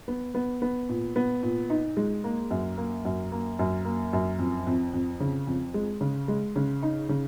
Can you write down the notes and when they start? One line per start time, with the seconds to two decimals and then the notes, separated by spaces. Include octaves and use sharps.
0.08 B3
0.34 B3
0.62 B3
0.89 A#2
1.16 B3
1.43 A#2
1.70 D#4
1.97 G#3
2.24 A#3
2.51 F#2
2.78 A#3
3.05 F#2
3.32 A#3
3.59 F#2
3.85 A#3
4.13 F#2
4.39 F2
4.67 F2
4.94 F2
5.20 C#3
5.47 F2
5.74 G#3
6.01 C#3
6.28 G#3
6.56 C#3
6.83 D#4
7.09 C#3